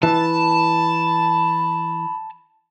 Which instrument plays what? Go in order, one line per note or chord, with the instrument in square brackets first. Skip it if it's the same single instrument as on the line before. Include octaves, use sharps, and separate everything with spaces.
[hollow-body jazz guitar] E3 [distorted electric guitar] A5 [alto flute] B5